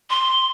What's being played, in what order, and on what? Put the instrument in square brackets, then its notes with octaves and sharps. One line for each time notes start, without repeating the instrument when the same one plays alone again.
[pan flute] C6